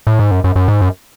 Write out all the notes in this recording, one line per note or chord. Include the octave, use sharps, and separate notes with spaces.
A2
G#2
F#2
F#2
F#2
G#2
F#2